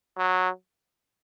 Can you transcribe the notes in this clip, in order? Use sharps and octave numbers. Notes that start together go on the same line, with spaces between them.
F#3